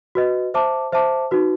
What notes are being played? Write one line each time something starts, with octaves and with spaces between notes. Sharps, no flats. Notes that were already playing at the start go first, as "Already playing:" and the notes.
F#4 B4 D#5
C5 E5 A5 D6
C5 E5 A5 D6
D#4 F#4 B4